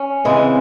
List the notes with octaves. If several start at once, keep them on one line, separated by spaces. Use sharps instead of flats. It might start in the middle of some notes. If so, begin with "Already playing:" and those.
Already playing: C#4
C#3 E3 G#3 C4